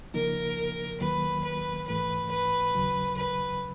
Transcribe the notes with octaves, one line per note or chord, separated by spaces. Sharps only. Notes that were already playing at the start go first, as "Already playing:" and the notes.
C#3 F3 A#3 D#4 A#4
D#2 D#3 F#3 A#3 B4
B4
G#2 E3 A3 B4
B4
D#2 C#3 F#3
B4